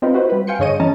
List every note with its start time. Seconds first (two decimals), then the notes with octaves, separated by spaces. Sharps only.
0.02 C4 D#4 F4 B4
0.14 E4 F#4 B4 C5
0.30 G3 B4
0.47 F5 G5 G#5 C6 C#7
0.59 G2 D3 G#4 C#5 D#5 D#7
0.80 E3 C#4 A5 A#5